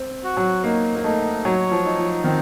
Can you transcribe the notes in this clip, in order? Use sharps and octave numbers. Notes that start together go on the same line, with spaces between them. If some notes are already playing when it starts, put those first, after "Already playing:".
Already playing: C4
F#4
F#3
A#3 D#4
A#3
A3 D#4
F#3 C#5
F3
D#4
F3
D#3 C4